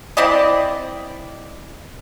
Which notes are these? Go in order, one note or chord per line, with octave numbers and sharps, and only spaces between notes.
C4 E4 D5 D#5